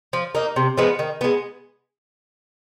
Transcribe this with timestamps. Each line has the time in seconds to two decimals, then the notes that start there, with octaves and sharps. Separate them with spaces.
0.13 F3
0.35 A#3 D#4
0.56 C3
0.77 F3 G#3 B3
0.99 D#3
1.21 G#3 B3